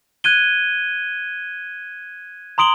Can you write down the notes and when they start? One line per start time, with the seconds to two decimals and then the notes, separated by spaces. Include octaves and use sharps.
0.24 F#6 G#6 D#7 G7
2.58 A#5 C6 D#6 D7 F#7 G7